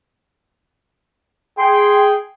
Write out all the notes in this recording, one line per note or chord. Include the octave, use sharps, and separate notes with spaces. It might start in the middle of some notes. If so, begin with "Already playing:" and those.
G#4 G5 C6